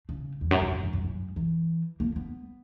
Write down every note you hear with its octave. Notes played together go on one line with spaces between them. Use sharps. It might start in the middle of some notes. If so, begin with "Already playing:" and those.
C#3
E2
F#2
F#2
F#2
F#2
F#2
F#2
E3
A#3
B3